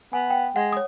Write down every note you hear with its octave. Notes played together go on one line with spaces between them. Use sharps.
B3 G#5
G5
G#3 F#5
C#5 D#6